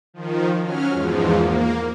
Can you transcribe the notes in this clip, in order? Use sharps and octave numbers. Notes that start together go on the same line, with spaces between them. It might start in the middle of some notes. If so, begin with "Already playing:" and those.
D#3 F3
F#3 C#4 F6
E2 G#2 F3
A#3